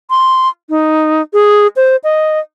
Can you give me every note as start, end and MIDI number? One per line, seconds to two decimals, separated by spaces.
0.10 0.48 84
0.69 1.22 63
1.33 1.67 68
1.76 1.96 72
2.04 2.39 75